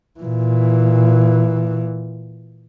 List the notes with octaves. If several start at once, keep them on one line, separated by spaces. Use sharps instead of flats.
A#2 E3